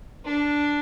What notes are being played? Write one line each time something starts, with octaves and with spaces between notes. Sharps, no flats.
D4